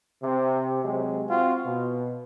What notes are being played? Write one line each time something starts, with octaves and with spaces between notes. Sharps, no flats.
C3
C3 F#3 G#3
C4 F4 F#4
B2